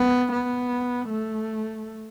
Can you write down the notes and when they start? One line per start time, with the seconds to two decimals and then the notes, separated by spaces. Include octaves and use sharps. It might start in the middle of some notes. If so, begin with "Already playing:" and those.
Already playing: B3
0.32 B3
1.09 A3